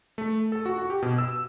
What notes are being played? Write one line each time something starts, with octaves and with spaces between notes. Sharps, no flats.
A3
A4
F#4
F#4
G4
B2
E6